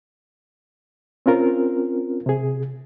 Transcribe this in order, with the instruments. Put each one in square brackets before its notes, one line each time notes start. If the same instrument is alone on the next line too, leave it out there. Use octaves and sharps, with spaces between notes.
[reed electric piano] C4 C#4 F4 A#4
C3 G#4